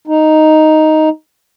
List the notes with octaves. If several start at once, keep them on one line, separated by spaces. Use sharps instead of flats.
D#4